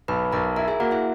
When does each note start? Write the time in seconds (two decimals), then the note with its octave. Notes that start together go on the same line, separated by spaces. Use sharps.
0.08 B1 B4 B5
0.32 B1 A#4 A#5
0.56 E4 A#4 A#5
0.68 G#4 G#5
0.80 A#3 F#4 F#5
0.91 E4 E5